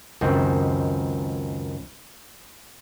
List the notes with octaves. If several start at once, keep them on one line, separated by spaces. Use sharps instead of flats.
C#2 F#2 D#3 C4